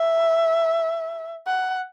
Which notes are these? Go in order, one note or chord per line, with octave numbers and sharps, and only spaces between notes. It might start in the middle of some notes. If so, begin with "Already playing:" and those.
Already playing: E5
F#5